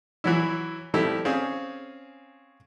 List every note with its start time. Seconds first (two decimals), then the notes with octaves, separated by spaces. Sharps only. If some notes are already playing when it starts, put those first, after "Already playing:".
0.24 E3 F#3 E4
0.94 F3 G3 A3 C4 E4 G4
1.25 C4 C#4 G#4 F5